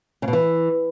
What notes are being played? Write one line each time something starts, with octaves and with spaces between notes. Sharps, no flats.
C#3
B2
E3